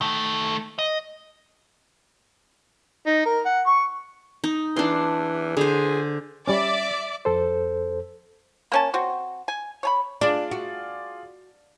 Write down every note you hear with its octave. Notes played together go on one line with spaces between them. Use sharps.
D#3 A3
D#5
D#4
A#4
F#5
C#6
D#4
E3 D4 C6
D3 G#4 C5
G3 C#4 D5 E5 D6
F2 A4 C5
A#3 C#4 A5
C4 F#4
G#5
C#5 G#5 B5
D4 F4 G#4 D5
F#4